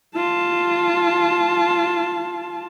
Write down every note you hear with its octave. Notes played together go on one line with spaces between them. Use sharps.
F4 A5